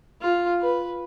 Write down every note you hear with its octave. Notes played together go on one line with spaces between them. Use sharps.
F4
B4